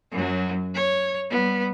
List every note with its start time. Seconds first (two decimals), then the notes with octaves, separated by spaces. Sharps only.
0.12 F#2 F#3
0.75 C#5
1.30 G3 B3